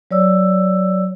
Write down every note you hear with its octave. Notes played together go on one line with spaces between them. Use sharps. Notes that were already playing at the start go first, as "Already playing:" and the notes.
F#3 C#5 D5 E6